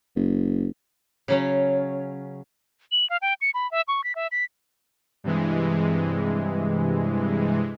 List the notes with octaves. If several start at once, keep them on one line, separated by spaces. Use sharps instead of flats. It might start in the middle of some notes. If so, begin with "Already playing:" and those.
F#1
C#3 F#3 C#4
F#7
F5
G5
C#7
B5
E5
C#6
B6
E5
B6
G2 C3 E3 G#3